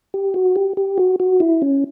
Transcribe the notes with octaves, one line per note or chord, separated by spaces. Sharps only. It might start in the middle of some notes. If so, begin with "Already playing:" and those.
G4
F#4
G4
G4
F#4
F#4
E4
C#4